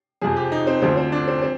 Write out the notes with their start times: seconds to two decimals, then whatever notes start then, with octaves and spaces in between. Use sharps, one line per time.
0.21 F2 C3 F3 G#4
0.36 G4
0.52 D#4
0.67 C4
0.82 D2 D3 F3 C4
0.97 C4
1.12 D4
1.28 C4
1.42 C4